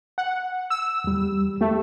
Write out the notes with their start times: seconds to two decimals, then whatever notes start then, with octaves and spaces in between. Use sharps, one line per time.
0.18 F#5
0.70 E6
1.04 E2 G3
1.61 A3 G4